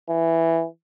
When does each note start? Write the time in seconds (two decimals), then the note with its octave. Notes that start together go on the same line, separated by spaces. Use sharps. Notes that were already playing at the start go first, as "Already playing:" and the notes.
0.09 E3